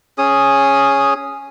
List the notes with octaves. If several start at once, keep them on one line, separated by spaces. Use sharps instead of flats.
C#4 G#4 D#6